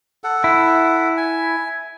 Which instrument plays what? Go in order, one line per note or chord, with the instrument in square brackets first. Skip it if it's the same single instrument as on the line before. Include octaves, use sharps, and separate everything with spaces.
[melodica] A4 F#5
[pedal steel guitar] E4
[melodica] G#5